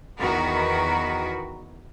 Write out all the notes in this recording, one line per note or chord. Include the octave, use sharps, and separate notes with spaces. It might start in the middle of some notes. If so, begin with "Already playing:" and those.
E2 D#3 F#4 A#4 B4